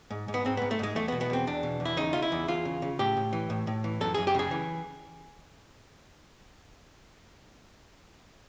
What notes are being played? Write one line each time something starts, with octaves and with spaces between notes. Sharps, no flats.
G#2
G#2
B3
G#2 C4
G#2 B3
A3
G#2 G#3
E2 A3
B3
B2
B3
E2 C4
E2 D4
B2
E2
E4
C#3 D#4
C#3 F4
E4
E2
E2 F4
C#3
C#3
A2 G4
A2
E3
A2
A2
E3
F#2 A4
F#2 G#4
G4
C#3 G#4
E3